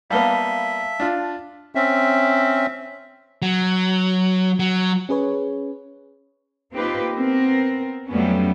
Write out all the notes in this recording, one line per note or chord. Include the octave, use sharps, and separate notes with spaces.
G3 A#3 B3 E5 F5 A5 G7
D4 F4
C4 C#4 E5
F#3
F#3
C#4 G#4 B4 C#5
A#3 C4 D#4 F4 G4 B4
B3 C4 A#4
F2 F#3 G3 A3 B3 C#4